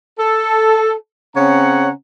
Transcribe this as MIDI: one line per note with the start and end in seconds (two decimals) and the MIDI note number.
0.18 0.92 69
1.35 1.89 49
1.35 1.89 60
1.35 1.89 61
1.35 1.89 73
1.35 1.89 78
1.35 1.89 82